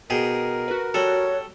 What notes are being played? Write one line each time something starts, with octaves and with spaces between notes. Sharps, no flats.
B2 G4 G#4 A#4
F#4 B4
G3 F#4 A4 C#5